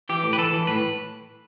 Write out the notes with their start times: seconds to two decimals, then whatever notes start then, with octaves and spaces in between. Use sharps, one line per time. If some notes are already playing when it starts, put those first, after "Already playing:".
0.09 E3 G4
0.24 A2
0.33 B4
0.38 E3 A4
0.53 E3
0.67 A2 B4